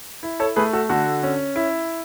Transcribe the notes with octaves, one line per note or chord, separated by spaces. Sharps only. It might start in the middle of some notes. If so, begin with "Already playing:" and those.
E4
A4 C#5
A3 G#4 B4
F#4 A4
D3 F#4 A4
C#4
E4